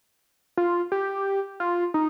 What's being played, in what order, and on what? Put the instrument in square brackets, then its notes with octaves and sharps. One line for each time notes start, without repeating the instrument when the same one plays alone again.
[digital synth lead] F4
G4
F4
D#4